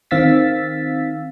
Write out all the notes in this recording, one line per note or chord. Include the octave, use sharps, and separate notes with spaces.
D#3 C4 F5 E6 A6 B6